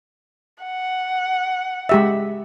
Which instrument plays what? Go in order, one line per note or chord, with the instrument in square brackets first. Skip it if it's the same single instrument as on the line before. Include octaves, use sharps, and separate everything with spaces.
[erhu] F#5
[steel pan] G#3 G4 E5